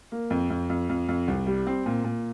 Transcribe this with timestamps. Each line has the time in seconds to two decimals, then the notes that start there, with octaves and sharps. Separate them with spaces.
0.12 A#3
0.30 F2
0.50 F2
0.70 F2
0.89 F2
1.09 F2
1.28 C2
1.47 G3
1.67 C4
1.86 A#2
2.04 A#2